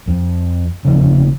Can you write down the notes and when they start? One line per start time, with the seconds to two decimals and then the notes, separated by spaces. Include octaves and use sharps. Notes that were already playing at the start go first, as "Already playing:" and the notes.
0.08 F2
0.85 F1 F2 C#3